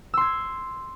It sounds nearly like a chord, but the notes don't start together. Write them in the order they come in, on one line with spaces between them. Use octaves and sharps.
E6 C6 G#6